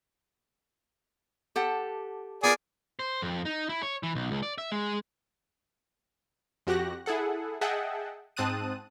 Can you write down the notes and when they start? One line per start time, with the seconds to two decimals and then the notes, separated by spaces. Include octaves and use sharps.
1.56 G4 A4 F#5
2.43 B3 F4 G#4 A#4 D5
2.99 C5
3.22 F2
3.45 D#4
3.69 E4
3.83 C#5
4.03 E3
4.15 B1
4.31 C#2
4.43 D5
4.58 E5
4.72 G#3
6.67 F2 F#4 G4 F#6 A#6
7.06 E4 G#4 A4 F#5
7.61 G#4 D#5 E5 F#5 G5 A5
8.37 G#2 C4 A5 D#6 F#6 D#7